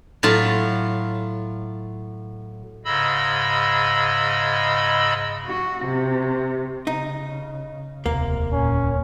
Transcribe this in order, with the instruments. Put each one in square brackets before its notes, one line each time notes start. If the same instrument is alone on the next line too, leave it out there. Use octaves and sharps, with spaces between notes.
[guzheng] A2 F#3 F4 A5
[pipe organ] G#2 C#3 D#5 B5 E6
[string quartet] F#4
C3
[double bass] C#3 [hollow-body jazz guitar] D#4
[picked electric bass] E1 D2 [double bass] C3 [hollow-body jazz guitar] A#3
[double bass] A#2 [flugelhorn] C#4